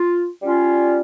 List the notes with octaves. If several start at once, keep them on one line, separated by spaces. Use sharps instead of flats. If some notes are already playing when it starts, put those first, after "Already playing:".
Already playing: F4
G3 C#4 F4